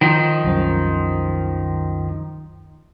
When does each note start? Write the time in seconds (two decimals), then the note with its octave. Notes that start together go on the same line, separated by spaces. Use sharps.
0.01 D#3 F3 D#4
0.44 C2 F#2 C5